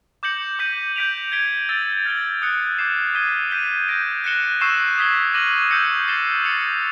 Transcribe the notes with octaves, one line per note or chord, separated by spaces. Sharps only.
D6 G6 A#6 C#7 F#7
D6 G6 B6 D#7 F#7
G6 B6 D7 F7
G#6 B6 D7 G7
E6 A6 D7 G7
F6 A6 D7 G7
D#6 F#6 A6 C#7
D6 G6 C7 E7
D#6 G#6 B6 D#7 G7
G6 B6 D#7 G7
G6 A#6 D7
F#6 A#6 C#7 E7 G7
C#6 E6 G6 C7 E7
D#6 G#6 B6 E7 G7
D6 F6 A#6 D#7 F#7
E6 G6 A#6 C#7
A6 C7 E7 G7
A6 C#7 F7